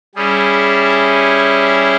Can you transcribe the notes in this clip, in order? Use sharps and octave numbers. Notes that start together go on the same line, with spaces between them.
G3 C#4 E4 G#4